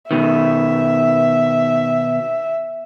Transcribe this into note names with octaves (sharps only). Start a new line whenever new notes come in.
B2 D#3 E5